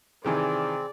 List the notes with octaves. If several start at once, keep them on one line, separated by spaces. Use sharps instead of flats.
C3 D#3 E3 C4 G#4 D5 G#5